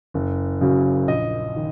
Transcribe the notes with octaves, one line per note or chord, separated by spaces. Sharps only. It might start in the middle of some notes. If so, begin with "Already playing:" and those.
F#1
F#2 C#3 F#3
A#1 D#5
D#3